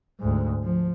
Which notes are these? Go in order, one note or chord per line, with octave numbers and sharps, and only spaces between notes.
D2 G#2
F3